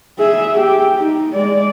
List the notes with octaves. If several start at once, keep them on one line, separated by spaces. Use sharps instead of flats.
G#4 E5
G4
D#4
G#3 D5